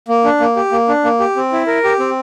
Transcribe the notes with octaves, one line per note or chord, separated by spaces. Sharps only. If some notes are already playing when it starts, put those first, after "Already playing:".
A#3
D4
A#3
G4
A#3
D4
A#3
G4
C4
E4
A#4
G4
C4